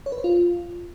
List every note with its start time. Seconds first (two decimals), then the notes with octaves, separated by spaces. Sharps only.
0.06 C#5
0.12 B4
0.18 C5
0.24 F4